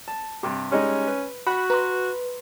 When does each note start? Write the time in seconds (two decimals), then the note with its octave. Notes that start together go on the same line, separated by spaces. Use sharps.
0.08 A5
0.43 G2 C3
0.72 G3 G#3 C#4 D#4
1.07 B4
1.47 F#4 F#5 B5 C#6
1.70 B4 A#5 C6